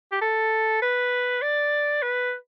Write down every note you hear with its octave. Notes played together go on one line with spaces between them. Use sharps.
G4
A4
B4
D5
B4